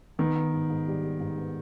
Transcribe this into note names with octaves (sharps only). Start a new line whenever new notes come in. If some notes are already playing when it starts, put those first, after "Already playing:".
D#3 B3
B3
G#2
G#2
G3
G3
G#2
B3